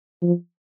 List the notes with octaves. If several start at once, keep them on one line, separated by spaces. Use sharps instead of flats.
F3